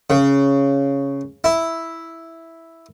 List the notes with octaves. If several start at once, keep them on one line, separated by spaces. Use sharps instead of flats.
C#3
E4